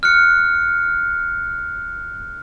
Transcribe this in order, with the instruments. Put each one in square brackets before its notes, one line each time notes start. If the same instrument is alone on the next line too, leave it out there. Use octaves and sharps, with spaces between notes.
[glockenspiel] F6 F#6 C#7